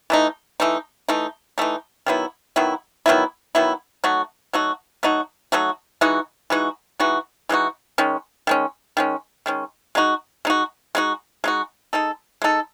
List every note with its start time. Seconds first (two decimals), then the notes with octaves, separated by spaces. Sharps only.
0.10 E3 A3 D#4
0.60 E3 A3 D#4
1.09 E3 A3 D#4
1.58 E3 A3 D#4
2.06 D#3 F#3 B3 E4
2.56 D#3 F#3 B3 E4
3.06 D#3 F#3 B3 E4
3.55 D#3 F#3 B3 E4
4.04 F#3 A3 D#4 F#4
4.53 F#3 A3 D#4 F#4
5.03 F#3 A3 D#4 F#4
5.52 F#3 A3 D#4 F#4
6.01 E3 G#3 D#4 F#4
6.50 E3 G#3 D#4 F#4
7.00 E3 G#3 D#4 F#4
7.49 E3 G#3 D#4 F#4
7.98 D#3 G#3 C#4
8.47 D#3 G#3 C#4
8.97 D#3 G#3 C#4
9.46 D#3 G#3 C#4
9.95 G#3 D#4 F#4
10.45 G#3 D#4 F#4
10.95 G#3 D#4 F#4
11.44 G#3 D#4 F#4
11.93 G#3 D#4 A4
12.42 G#3 D#4 A4